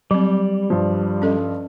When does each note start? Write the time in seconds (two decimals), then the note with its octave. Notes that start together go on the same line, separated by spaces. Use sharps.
0.11 F#3 G3 C4
0.70 G2 F3
1.22 C#4 A4 D#5